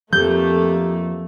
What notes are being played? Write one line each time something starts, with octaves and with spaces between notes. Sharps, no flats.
F2 F3 A3 A#3 G4 G6